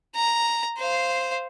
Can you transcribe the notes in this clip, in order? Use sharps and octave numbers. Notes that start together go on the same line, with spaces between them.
A#5
C5 F5